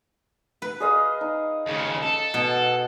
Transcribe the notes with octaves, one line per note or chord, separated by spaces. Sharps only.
B4
G#4 D#5 F5
D#4
D#2 C#3
A4
B2